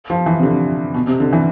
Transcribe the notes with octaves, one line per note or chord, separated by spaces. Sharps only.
F3
E3
C3
D3
B2
C3
D3
E3